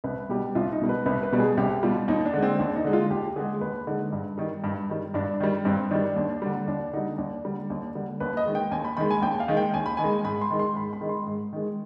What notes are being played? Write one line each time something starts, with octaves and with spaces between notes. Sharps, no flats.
C2 B4
B2 G3 G4
C2 F4
D#4
B2 G3
B4
C2 B4
B4
B2 G3
G#4
C2 G4
B2 G3 F4
D#2 D#4
D4
D3 G#3
C4
D#2 D4
D#4
D3 G#3
F4
D#2 G4
D3 G#3 G#4
D#2 B4
D3 G#3 D#4
G2
D#3 G3
G2
D#3 G3
G2 D4
D#3 G3
G2 C4
D#3 G3 D4
D#2
D3 G3
D#2 D4
D3 G3 D#4
D#2 D4
D3 G3
D#2
D3 G3
D#2 B4
D#5
D#3 G#3
G5
D#2 G#5
B5
D#3 G#3 B5
G#5
D#2 G5
F5
D#3 G#3
G5
D#2 G#5
B5
D#3 G#5
G#3
G#2 B5
C6
D#3 G#3
C6
G#2 B5
B5
D#3 G#3
C6
G#2
D#3 G#3